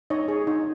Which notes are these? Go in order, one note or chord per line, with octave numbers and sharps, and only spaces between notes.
D#4 C#5 D#5
G#4
D#4